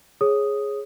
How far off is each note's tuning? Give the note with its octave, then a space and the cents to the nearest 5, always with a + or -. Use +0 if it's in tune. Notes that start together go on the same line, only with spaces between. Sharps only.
G#4 +0 C#5 -20 D#6 +0